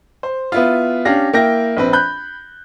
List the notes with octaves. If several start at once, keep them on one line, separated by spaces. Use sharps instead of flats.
C5
B3 E4 F4
C#4 D4 G4 F5 A#6
A#3 E4 G5 A#6
A#1 C4 B4
B5 F#6 G6